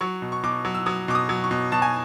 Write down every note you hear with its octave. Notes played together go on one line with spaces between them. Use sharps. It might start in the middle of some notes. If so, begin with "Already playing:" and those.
F#3 C#6
B2
C#6
B2 D6
F#3
E6
F#3 D#6
B2 D6
D#6
F#3
C#6
B2
B2 A5
G#5